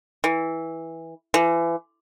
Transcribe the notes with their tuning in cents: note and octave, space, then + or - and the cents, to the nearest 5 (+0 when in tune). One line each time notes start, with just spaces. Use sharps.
E3 -10
E3 +30